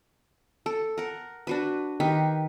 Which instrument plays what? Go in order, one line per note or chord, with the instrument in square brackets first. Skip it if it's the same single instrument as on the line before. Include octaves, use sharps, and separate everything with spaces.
[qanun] A4
A#4 F#5
D4 F#4 B4
D#3 G4 B4